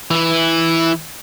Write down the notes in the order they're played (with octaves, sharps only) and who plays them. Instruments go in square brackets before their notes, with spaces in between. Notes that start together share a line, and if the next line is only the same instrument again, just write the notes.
[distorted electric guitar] E3 E4